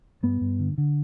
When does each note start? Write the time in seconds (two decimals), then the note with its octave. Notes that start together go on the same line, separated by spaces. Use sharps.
0.23 G2 B3
0.41 G2
0.59 D3
0.78 D3